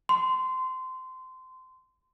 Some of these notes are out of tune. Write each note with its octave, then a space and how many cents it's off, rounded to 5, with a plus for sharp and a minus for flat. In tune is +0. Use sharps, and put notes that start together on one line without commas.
C6 -20